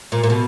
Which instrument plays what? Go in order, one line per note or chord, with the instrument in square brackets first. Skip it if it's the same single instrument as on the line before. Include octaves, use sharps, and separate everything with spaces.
[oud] A#2
A#2
B2